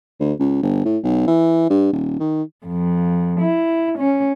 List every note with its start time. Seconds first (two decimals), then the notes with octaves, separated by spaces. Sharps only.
0.20 D2
0.39 C#2
0.63 G1
0.85 A2
1.03 B1
1.27 E3
1.70 G2
1.92 D#1
2.20 D#3
2.67 F2
3.41 E4
3.99 C#4